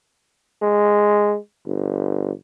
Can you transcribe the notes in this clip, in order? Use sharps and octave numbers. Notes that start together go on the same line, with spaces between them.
G#3
G1